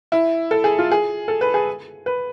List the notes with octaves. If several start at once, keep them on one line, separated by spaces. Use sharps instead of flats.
E4
A4
G#4
F4
G#4
A4
B4
G#4
B4